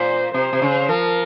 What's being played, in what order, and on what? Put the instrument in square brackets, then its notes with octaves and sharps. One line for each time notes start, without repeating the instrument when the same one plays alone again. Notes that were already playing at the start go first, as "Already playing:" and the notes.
Already playing: [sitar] A#2 [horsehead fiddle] C5
[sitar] C3 [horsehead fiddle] C5
[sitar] C3
C#3
[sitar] F3 [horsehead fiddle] A#4